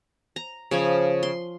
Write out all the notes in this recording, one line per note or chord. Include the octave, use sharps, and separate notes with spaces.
A#5
C#3 F3 C#5
C6